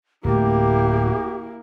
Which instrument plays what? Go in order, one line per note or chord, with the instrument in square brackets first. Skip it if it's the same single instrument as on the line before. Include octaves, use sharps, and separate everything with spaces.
[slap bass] D1 A3 [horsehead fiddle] A#3 E4 [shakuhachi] G4